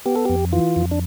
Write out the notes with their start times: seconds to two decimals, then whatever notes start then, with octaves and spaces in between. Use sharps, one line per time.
0.06 B3 G4
0.16 A4
0.25 F2 G4
0.53 E3 F4
0.76 F2
0.91 D4